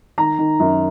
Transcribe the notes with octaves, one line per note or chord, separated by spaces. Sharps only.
D#3 A#5
D#3
F#2